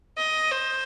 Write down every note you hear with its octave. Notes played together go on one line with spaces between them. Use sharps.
D#5
C5